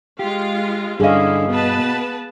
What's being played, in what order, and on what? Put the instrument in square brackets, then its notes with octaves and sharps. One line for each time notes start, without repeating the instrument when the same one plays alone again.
[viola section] G#3 F4 F5 [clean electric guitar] G4
[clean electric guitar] G2 D#5 [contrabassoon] D3 [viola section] C#4 E4 [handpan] G#4 F5
[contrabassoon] B2 [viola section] B3 B4 A5